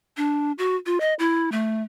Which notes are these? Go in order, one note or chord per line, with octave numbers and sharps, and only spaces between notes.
D4
F#4
F4
D#5
E4
A3